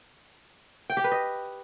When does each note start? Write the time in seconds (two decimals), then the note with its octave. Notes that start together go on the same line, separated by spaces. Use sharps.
0.90 G5
0.97 G4
1.04 B4
1.12 D#5